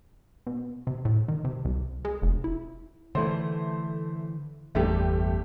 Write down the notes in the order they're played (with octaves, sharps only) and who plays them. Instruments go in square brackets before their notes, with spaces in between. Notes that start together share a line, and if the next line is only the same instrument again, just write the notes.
[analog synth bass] B2
C3
A2
D#3
C3
C2
G#3
F1
E4
[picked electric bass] D3 E3 [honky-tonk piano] A3 C5
[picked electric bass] G1 E2 G2 [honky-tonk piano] A3 G4